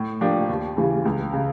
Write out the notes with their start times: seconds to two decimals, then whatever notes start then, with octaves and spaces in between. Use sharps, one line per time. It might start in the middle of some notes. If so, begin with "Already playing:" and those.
Already playing: A2
0.21 F3 A#3 D4 G4
0.49 D#2
0.77 C#3 E3 G3
1.05 C#2
1.33 C#3